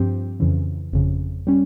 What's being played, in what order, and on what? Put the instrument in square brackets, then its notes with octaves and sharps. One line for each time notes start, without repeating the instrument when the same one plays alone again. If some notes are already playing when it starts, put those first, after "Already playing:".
Already playing: [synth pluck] G2 F3 C4 G4
F2 C#3 E3
G1 F2 C#3
G3 C#4